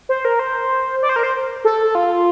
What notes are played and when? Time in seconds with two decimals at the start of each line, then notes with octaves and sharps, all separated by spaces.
0.09 C5
0.25 A#4
0.39 C5
1.02 D5
1.09 C5
1.16 A#4
1.23 C5
1.65 A4
1.95 F4